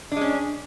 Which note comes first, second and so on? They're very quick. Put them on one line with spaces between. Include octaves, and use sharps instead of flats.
D4 G#3 C#4